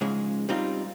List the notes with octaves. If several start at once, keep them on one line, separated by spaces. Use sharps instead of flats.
G#2 C#3 F3 G#3 G#4
G3 C4 D#4 F4